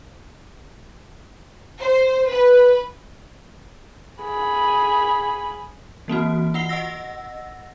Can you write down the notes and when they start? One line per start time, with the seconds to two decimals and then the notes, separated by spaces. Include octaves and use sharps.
1.79 C5
2.29 B4
4.23 G#4 B5
6.08 E3 A#3 C4 F#4
6.54 F4 F#5 C7 G7
6.69 D#5 F#5 E6 A#6